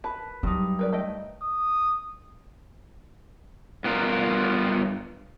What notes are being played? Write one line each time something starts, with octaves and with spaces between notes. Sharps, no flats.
B4 A5
G2 F#3 D#4
A#4 B4 D5
A3 D#5 G5
D#6
G2 B3 F4 A#4